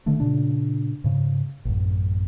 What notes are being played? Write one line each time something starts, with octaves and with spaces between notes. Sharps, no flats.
D3 D#3 A3 D4
A#2 C#3 D4
G#2 C#3
A1 F#2